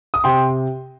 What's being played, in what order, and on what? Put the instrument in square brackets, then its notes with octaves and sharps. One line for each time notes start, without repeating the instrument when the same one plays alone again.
[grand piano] D#6
C3 G5 C6